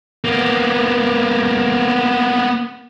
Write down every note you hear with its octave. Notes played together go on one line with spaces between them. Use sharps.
A#3 B3